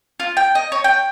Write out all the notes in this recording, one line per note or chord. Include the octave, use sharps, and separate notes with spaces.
F4
G5
D#5
C#5
G5